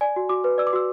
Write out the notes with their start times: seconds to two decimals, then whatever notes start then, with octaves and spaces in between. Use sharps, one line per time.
0.01 D5 G#5
0.16 F#4
0.29 F#4 D6
0.44 B4
0.58 D5 E6
0.67 D6
0.73 F#4 E6